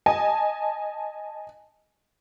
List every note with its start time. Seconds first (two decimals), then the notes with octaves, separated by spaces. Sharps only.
0.06 D#5 G#5 A5